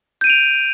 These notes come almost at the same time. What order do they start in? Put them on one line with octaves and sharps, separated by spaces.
G6 D#7 D7 F7